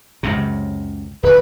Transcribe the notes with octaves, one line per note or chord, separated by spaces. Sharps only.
C#2 F#2 C3
D1 D#2 B4